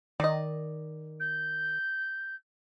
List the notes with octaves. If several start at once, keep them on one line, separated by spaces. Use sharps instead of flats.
D#3 D5 D#5
G6